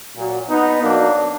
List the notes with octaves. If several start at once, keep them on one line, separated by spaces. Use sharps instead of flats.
A#2 F#3
B3 D#4
B2 F#3 A#3 D4